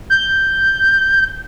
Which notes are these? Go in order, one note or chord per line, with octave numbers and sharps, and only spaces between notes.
G6